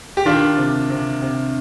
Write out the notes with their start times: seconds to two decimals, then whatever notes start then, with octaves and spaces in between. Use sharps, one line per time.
0.17 G4
0.25 D#3 D4 F4
0.57 C3
0.90 C3
1.22 C3